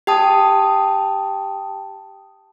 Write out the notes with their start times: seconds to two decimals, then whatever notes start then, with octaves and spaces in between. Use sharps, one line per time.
0.07 G4 G5 A5 D#6